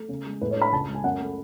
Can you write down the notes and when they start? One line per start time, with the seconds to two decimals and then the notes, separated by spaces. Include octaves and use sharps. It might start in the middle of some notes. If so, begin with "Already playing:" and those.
Already playing: A3
0.09 C#3
0.26 G#3
0.41 A2 B4
0.51 C#5
0.56 D4
0.62 B5
0.72 C#2 A5
0.88 G#3
0.95 G#5
1.04 F#2 F#5
1.20 A3